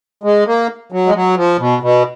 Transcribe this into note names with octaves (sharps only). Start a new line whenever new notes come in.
G#3
A#3
F#3
G#3
F#3
F3
B2
B2